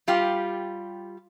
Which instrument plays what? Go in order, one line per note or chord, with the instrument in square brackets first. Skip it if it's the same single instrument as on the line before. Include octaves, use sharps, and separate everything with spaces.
[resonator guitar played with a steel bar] G3 F4 G4